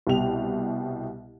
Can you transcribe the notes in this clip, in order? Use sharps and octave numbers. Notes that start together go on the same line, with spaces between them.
C2 B2 G4 F7